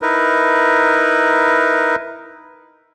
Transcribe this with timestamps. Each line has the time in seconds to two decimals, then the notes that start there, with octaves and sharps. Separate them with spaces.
0.02 D#4 E4 A#4 B4